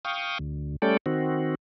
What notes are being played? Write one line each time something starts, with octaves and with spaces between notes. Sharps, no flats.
F5 G5 C#6 D#6
D2
G3 A3 C#4 A4 D5 G5
D#3 C4 F#4